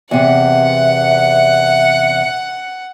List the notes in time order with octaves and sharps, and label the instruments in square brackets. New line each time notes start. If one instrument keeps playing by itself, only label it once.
[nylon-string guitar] E2 C3 [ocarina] E5 [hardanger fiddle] F#5